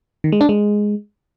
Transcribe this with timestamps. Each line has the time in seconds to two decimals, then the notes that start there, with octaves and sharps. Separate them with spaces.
0.24 D#3
0.32 G#3
0.41 D4
0.49 G#3